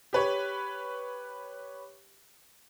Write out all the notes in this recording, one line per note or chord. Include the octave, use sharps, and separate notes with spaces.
G4 B4 C#5